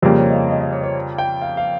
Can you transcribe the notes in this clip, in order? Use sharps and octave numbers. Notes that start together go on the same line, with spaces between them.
F2 C#3 G3 A#3 C5
C#5
D#5
F5
D#5
D#5
C#5
C#5
G5
F5
F5